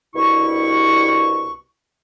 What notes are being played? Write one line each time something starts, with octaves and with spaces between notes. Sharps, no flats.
C2 G2 B2 E4 C#6